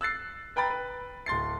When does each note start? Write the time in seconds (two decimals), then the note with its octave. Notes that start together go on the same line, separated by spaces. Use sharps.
0.01 E6 F#6 A6 C7
0.56 B4 G5 A#5 B5 A6
0.70 B4
1.26 D1 C6 A6 C7